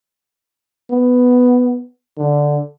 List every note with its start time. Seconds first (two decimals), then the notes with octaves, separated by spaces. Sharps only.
0.90 B3
2.18 D3